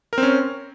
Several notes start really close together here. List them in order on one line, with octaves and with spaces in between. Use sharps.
A#4 C4 C#4